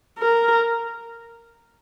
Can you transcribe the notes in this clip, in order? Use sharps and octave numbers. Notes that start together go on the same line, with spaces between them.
A#4